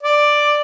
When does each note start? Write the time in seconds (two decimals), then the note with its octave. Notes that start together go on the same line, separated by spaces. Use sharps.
0.03 D5